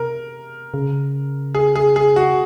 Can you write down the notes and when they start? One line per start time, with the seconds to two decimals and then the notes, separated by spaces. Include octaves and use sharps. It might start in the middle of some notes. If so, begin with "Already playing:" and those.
Already playing: C3 A#4
0.74 C#3
1.55 G#4
1.76 G#4
1.96 G#4
2.16 F#4